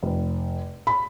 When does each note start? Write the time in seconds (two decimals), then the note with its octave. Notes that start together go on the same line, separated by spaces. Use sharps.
0.03 F1
0.87 B5